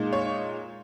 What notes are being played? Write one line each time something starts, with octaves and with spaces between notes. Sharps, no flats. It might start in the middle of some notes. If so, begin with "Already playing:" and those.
Already playing: A#2 G#3 D#4
C#5